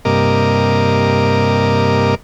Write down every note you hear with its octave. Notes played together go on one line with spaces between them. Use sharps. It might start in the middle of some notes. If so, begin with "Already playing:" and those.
G2 C3 A#3 A#4 D#5 D6